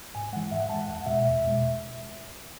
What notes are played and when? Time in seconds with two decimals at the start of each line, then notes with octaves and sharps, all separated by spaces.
0.15 G#2 G#5
0.33 E3 G#3 F#5
0.51 G#2 E5
0.60 F#5
0.69 G#3 A5
0.74 E3 F#5
0.88 E2 F#5
1.06 B2 G#3 E5
1.24 E2
1.43 B2 G#3